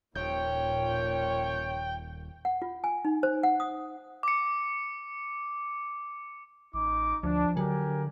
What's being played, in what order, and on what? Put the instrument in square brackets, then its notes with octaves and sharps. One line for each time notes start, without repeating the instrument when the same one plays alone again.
[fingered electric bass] D#1 [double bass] A#2 [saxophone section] F3 C#4 C#5 [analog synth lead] G5
[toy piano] F#5
F4
G#5
D#4
C5
F#5
D#6
[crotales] D6 C#7
[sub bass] A1 [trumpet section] D#4 D6
[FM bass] D2 [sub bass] F3 [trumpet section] D4
[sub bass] D3 [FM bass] F#3 [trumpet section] G4 A#4 G#5